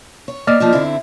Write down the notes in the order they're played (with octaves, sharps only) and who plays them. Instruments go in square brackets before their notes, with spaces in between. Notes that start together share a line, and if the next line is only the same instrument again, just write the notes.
[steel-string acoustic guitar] C#5
[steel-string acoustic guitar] A#3 [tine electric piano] D5 D#5 F6
[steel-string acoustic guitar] F3 A#3 D#4
D3 C4 E4